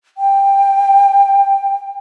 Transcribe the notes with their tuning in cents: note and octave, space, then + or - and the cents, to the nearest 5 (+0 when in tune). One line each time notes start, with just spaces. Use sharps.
G5 +15